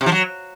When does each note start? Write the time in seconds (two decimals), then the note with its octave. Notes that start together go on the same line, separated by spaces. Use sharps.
0.01 C3
0.06 F3
0.12 F#3